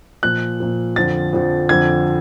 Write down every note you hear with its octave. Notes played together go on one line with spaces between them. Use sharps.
A#2 F3 F#6
A#2 F3
F2 D3 F3 A6
F2 D3 F3
F2 D3 F3 G#6